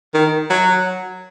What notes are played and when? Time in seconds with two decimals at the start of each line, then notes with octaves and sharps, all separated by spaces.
0.14 D#3
0.50 F#3